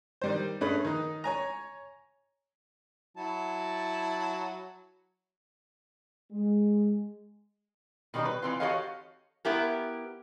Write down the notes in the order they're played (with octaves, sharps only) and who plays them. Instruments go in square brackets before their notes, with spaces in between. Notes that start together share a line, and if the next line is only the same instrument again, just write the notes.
[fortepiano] D#3 G3 C5
G2 A3 C#4 G#4 B5
D#3 D#4
C#5 G#5 A#5
[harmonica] F#3 E4 A5
[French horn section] G#3
[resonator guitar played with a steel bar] B2 D#3 G3 C4 C#4 D#4
B4
E3 C4 F4
F#4 G4 A4 C#5 D#5 F5
B3 E4 G4 A#4